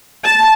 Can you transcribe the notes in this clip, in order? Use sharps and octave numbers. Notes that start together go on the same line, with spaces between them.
A5